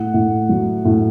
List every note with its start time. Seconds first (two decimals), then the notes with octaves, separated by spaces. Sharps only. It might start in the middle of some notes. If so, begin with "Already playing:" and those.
Already playing: A2 F#5
0.14 A2
0.49 F#3
0.85 A2